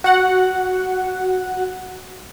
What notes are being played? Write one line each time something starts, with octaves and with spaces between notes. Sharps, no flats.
F#4 F#5